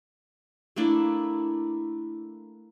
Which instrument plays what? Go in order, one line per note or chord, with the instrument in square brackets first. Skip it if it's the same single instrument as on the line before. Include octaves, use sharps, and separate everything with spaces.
[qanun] A3 A#3 D4 E4